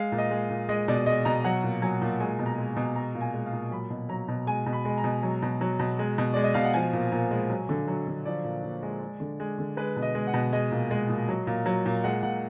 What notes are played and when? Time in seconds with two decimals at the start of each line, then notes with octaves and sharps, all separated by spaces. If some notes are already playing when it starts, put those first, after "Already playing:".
Already playing: G#3 F5
0.12 A#2
0.18 D#5
0.31 G#3
0.50 A#2
0.69 G#3 D#5
0.88 B2 D5
1.06 G#3 D#5
1.25 B2 A#5
1.44 F#3 F#5
1.63 A#2
1.82 F#3 G#5
2.01 A#2
2.20 G#3 G#5
2.39 B2
2.46 A#5
2.58 G#3
2.76 B2
2.96 G#3 A#5
3.15 A#2
3.21 G#5
3.34 G#3
3.46 F5
3.53 A#2
3.71 F#3 B5
3.90 B2
4.09 F#3 A#5
4.28 B2
4.47 G#3 G#5
4.66 B2
4.73 B5
4.85 G#3
4.98 A#5
5.04 B2
5.23 F#3
5.42 B2
5.61 F#3
5.79 B2
5.99 G#3
6.18 B2
6.34 G#3 D5
6.44 D#5
6.54 B2 F5
6.64 F#5
6.74 F3 G#5
6.93 A#2
7.12 A#2
7.31 G#3
7.50 F#3
7.69 D3
7.88 F#3
8.07 D3
8.25 F3 D5
8.44 A#2
8.64 A#2
8.83 G#3
9.01 G#3
9.20 D3
9.40 G#3
9.58 D3
9.77 G#3 B4
9.96 B2
10.02 D#5
10.15 G#3
10.27 F#5
10.34 B2
10.53 G#3 D#5
10.71 A#2
10.91 G#3
11.09 A#2
11.29 F#3
11.47 A#2
11.66 F#3
11.86 A#2
12.04 G#3 F#5
12.23 A#2 F#5